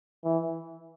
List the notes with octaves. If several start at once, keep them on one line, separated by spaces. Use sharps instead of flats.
E3